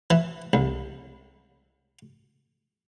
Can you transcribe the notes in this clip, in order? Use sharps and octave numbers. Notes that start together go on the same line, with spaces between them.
E3
C2